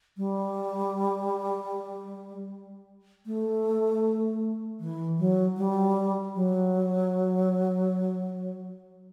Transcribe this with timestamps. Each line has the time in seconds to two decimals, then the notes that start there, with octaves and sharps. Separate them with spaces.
0.17 G3
3.26 A3
4.80 E3
5.19 F#3
5.57 G3
6.35 F#3